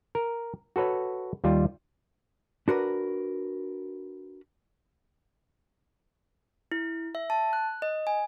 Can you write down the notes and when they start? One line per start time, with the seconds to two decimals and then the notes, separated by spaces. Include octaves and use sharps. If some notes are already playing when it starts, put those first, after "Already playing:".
0.15 A#4
0.76 F#4 A4 B4 C#5
1.44 D#2 G3 F4
2.68 D4 F#4 A#4 B4
6.72 E4
7.15 E5
7.30 A5
7.53 F#6
7.82 D#5
8.07 G#5